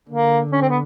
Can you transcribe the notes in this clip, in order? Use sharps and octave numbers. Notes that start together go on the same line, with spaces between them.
D3 A#3
C#4
C4
B3